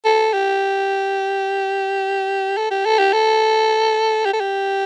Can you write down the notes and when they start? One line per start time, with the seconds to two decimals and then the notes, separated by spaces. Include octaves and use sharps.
0.05 A4
0.33 G4
2.57 A4
2.71 G4
2.85 A4
2.99 G4
3.13 A4
4.26 G4
4.33 A4
4.40 G4